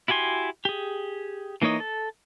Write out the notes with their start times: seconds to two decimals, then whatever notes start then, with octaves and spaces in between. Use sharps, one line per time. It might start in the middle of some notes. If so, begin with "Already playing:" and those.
0.08 E4 F#4 G4 G#5 C6
0.65 G4 G#4
1.62 E3 A#3 D#4 C#5 D#5
1.80 A4